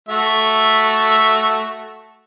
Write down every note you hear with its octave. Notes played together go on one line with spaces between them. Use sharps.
A3 F#4 E5